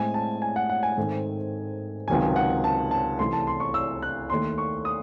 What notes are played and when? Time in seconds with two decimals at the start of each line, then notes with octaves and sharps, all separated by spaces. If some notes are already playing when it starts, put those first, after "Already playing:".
Already playing: A2 G#3 C4 G#5
0.14 A5
0.42 G#5
0.56 F#5
0.70 F#5
0.83 G#5
0.97 G#2 D#3 A3 C4
2.08 C#2 C3 D#3 F#3 C#4 G#5
2.36 F#5
2.64 A5
2.91 A5
3.19 C2 C3 E3 A3 C6
3.33 A5
3.47 C6
3.60 C#6
3.74 E6
4.02 F#6
4.30 D#2 D#3 A3 C6
4.58 C#6
4.85 D#6